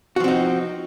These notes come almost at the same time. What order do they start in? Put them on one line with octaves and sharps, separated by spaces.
F#4 F3 C4 D#4